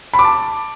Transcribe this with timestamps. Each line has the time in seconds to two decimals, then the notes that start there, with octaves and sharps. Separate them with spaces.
0.14 B5
0.19 D6
0.24 A5